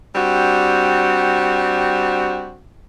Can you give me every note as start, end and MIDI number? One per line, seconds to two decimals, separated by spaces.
0.15 2.60 55
0.15 2.60 60
0.15 2.60 62
0.15 2.60 66